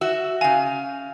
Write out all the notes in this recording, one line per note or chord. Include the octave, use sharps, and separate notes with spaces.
F#4 E5
C#3 F5 G#5